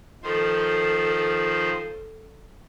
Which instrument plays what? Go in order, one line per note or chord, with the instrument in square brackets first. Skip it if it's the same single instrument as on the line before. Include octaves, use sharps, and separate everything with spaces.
[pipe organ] D#3 F3 C5 [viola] A4